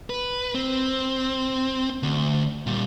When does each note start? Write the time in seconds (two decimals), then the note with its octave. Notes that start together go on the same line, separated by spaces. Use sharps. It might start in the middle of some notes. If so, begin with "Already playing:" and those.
0.10 B4
0.55 C4
2.03 D2
2.66 A#2 G3